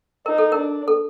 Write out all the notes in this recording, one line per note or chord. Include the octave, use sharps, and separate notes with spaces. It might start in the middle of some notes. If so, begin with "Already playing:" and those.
D#4 A#4
A4
D4 A#4
A4